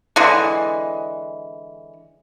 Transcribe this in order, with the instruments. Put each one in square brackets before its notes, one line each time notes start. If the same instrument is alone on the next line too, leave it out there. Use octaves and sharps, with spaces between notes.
[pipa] D3 E3 G#3